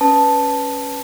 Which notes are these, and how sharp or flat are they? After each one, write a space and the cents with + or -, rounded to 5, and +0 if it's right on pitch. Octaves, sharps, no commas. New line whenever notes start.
C#4 +0 B4 +0 A5 +0